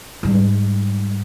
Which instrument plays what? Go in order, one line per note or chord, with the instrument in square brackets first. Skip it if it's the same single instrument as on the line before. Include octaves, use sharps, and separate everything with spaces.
[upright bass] G#2 G3